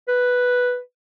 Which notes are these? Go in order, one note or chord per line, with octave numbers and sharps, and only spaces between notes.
B4